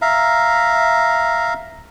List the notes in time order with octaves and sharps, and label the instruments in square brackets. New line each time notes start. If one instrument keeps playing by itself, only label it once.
[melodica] E5 F5 A#5